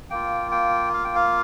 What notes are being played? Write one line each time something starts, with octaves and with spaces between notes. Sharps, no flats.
A#3 F4 G5
G5
F5
G5
F5